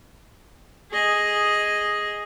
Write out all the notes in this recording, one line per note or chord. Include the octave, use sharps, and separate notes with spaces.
G#4 D#5